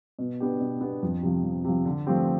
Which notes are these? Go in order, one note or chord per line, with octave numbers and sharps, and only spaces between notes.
B2
B3 D4 G4
B2
B3 D4 G4
F2
C3 F3
F2
C3 F3
D3
F3 A3 C4 G4